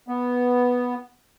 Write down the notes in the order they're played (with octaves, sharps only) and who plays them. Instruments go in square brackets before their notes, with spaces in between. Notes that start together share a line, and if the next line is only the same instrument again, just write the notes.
[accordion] B3